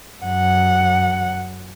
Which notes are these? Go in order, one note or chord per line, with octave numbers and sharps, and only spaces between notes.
F#2 F#5